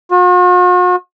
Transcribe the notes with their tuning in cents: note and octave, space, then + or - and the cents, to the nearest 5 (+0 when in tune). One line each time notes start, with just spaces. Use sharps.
F#4 -45